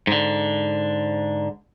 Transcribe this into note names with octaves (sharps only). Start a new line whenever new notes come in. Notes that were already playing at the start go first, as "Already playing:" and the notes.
G#2 D3